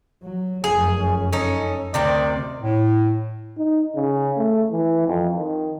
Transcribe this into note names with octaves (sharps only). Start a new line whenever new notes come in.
F#3
F1 F#2 G#4
C#4
C#4 D#4 A4
D2 C3 D#3 C4 D5
A2
D#4
C#3
A3
E3
F2
D#3